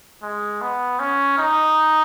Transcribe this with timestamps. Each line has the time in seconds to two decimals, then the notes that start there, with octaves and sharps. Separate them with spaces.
0.23 G#3
0.61 B3
1.00 C#4
1.38 D#4